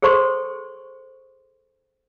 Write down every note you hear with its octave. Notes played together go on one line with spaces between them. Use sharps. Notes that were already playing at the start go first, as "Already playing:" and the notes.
G#4 A4 C5 C6 C#6